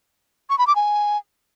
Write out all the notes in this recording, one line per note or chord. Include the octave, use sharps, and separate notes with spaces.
C#6
B5
D6
G#5